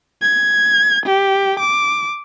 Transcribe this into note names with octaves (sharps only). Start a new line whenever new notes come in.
G#6
G4
D6